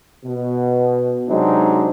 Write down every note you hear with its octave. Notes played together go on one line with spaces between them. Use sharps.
B2
C3 F#3 G#3 C4 D4 D#4